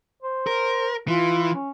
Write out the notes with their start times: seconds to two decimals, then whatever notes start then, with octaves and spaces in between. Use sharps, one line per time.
0.22 C5
0.47 A#4
1.08 E3 F4
1.55 C#4